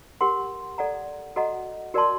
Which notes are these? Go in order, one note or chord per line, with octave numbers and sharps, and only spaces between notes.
G4 A#4 F#5 C6
A4 D5 F#5 A#5
F#4 A4 D#5 F#5 A#5
F#4 A#4 D5 A5 C6